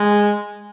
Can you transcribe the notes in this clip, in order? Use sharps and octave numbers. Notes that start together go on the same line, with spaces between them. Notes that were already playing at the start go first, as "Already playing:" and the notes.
Already playing: G#3